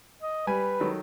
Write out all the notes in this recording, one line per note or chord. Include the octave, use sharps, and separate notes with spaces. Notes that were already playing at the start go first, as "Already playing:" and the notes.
D#5
G3 B4 G#5
D#3 F#3 A4